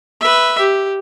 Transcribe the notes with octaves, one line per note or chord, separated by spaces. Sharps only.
B4 E5
G4